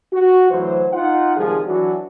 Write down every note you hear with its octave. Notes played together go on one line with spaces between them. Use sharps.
F#4
D2 E3 F#3 C5
D#4 F4 F#5
C2 D#3 F3 G#3 G#4
E3 F#3 D4 F#4